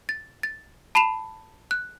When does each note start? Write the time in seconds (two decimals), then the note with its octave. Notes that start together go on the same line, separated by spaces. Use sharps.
0.09 A6
0.43 A6
0.95 A5 B5 C7 E7 F7
1.71 F#6